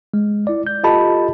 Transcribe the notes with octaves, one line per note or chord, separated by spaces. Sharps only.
G#3
E4 D5
G6
F4 G4 A4 D#5 A5 B5